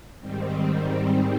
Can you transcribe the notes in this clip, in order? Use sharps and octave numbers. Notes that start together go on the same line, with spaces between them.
G#2 D#3 G3 C4